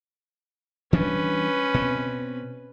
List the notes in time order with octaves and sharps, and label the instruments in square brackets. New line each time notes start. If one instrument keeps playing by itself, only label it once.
[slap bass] E3 G3 D4 [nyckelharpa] C#4 B4
[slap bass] B2 C4